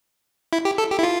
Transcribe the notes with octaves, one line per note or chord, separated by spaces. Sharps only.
E4
G4
A4
G4
E4
F4